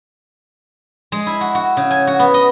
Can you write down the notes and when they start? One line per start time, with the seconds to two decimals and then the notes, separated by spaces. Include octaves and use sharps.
1.12 G#3
1.27 E4
1.41 F#4
1.55 F#4
1.77 C#3
1.91 G#5
2.07 F#4
2.19 B3
2.34 D#5